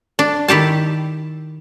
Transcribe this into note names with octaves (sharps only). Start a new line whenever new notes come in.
D4
D#3 E4 G4 A5